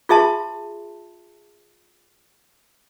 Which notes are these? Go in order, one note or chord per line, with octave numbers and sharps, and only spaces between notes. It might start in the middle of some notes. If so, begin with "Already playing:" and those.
F4 G#4 E5 A5 C6